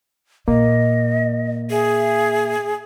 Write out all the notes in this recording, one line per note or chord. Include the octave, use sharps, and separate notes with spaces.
A#2 A#3 D#5
G#4 E5